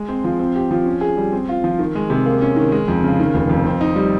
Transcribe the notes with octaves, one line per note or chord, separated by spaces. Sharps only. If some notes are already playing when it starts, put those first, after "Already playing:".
Already playing: G#3
C4
F3
C4
G4
F3
C#4
G#4
G3
C4
F4
F3
D#3
G#3
C3
A#3
C#4
D#3
G#3
F2
C#3
D#3
F1
F2
C4
D#4
G3